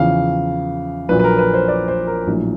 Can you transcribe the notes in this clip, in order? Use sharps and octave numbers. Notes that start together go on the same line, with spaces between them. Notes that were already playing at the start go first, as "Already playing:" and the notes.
Already playing: E2 C#3 F3 F5
A#1 A#2 F#3 B4
B4
A#4
B4
C5
D5
C5
A#4
A#1 A2 F#3